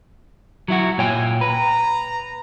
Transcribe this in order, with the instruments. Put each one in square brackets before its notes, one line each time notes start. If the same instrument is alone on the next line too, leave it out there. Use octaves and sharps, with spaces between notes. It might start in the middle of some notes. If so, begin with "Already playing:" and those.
[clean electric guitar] F#3 E4 F#4
[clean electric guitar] A#2 C#5 G5 [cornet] G#5
[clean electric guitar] B4 [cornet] A#5